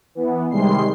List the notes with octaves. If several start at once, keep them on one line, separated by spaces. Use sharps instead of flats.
E3 B3
C3 D#3 G3 G#3 C6 C7